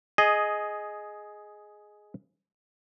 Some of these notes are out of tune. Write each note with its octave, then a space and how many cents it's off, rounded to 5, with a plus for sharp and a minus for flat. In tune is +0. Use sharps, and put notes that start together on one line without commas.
G#4 +10 D#5 +0